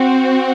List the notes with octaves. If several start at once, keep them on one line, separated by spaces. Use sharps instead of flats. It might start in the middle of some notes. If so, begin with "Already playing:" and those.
Already playing: C4 F#4